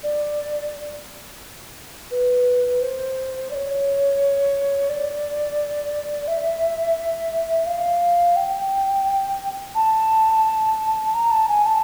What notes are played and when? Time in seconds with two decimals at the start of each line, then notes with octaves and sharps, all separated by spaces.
0.03 D5
2.11 B4
2.81 C5
3.51 D5
3.55 C#5
4.89 D5
6.28 E5
7.66 F5
8.36 G5
9.75 A5
11.14 A#5
11.31 A5
11.48 G#5
11.66 A5